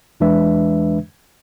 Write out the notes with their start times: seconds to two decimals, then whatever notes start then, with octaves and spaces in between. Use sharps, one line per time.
0.20 E2 E3 G#3 D4 B4 E5